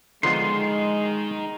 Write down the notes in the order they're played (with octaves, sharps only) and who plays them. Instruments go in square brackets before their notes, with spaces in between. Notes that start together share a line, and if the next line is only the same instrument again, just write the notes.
[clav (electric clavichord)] D3 F3 B3 [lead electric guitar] D#3 D#4 [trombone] G#3 [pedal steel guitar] C6